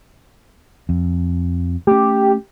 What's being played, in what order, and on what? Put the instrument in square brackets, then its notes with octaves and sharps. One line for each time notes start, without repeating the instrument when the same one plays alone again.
[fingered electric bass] F2
[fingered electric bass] A3 C#4 [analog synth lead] G4